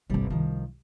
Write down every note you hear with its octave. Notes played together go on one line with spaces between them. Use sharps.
G1 C2 G3 C4 D5
C2 D#3 F3